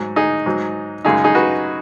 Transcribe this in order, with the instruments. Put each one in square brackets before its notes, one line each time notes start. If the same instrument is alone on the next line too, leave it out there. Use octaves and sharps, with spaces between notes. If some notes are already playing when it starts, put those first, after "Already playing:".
Already playing: [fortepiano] G#2 F#3
D#4 G#4
G#2 F#3
F#2 C#3 G#3 D#4 G#4
D#4 G#4
F#4 B4